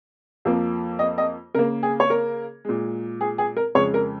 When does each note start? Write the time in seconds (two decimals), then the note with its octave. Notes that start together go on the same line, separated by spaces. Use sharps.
0.45 F2 F3 A#3
0.99 D#5
1.18 D#5
1.55 C#3 A#3 A#4
1.83 G#4
2.00 C#5
2.10 A#4
2.65 A#2 G#3
3.21 G#4
3.38 G#4
3.57 A#4
3.75 F2 C#3 G#3 C#5
3.94 A#4